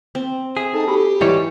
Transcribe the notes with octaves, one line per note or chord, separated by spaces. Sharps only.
C4
G#4 E5
D#4 A4 A5
F#4 G4 A4 B5
G#2 E3 G3 C#5